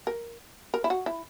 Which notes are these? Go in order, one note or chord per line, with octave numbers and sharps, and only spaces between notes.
A#4
A#4
E4
F#4
E4